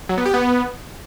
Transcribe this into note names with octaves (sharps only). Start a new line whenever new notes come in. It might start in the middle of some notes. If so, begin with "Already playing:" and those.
F#3
B3
G4
B3